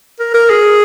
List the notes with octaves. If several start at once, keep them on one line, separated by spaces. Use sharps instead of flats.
A#4
A#4
G#4